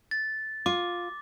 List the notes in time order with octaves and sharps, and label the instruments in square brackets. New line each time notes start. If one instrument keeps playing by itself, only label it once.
[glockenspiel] A6
[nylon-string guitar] F4 [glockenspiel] D6